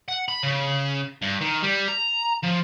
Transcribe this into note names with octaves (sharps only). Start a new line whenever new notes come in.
F#5
B5
C#3
G2
D#3
G3
A#5
F3